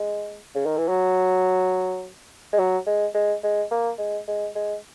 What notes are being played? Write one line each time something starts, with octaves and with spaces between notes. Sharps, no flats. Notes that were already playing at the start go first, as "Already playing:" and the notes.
Already playing: G#3
C#3
D#3
E3
F#3
G#3
F#3
G#3
G#3
G#3
A#3
G#3
G#3
G#3